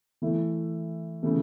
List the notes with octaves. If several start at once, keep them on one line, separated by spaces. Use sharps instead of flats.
E3 A3 E4
C#3 E3 A3